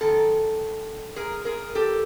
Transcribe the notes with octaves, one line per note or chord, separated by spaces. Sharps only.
F#2 D#3 A4
G#4 A#4
G#4 A#4
G4 A4